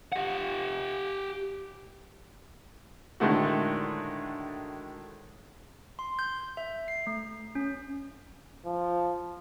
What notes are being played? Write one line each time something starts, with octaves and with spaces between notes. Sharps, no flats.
G4 F#5
A2 D3 D#3 G#3 A3 F#4
C6
G6
E5
C7
A3
C#4
F3